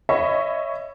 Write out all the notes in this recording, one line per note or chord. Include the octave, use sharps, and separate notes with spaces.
C#5 D#5 E5 B5 C#6